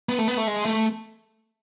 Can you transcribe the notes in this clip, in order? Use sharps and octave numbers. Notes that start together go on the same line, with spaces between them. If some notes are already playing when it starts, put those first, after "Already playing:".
B3
A3
B3
A3
G#3
A3